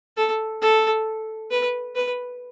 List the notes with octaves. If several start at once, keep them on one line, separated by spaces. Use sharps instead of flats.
A4
A4
B4
B4